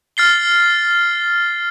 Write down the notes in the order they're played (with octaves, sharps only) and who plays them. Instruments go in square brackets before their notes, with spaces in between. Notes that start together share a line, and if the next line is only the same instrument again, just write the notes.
[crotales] F6 A6 C7 G7